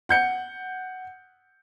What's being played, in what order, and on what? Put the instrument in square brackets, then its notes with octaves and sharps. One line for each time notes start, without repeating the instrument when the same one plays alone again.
[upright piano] F#5 G6 C#7